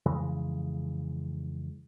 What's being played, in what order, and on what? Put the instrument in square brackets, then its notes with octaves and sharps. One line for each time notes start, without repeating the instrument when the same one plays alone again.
[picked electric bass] F2 C#3 E3 G#3